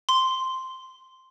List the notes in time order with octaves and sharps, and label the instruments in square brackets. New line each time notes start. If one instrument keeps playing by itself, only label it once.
[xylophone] C6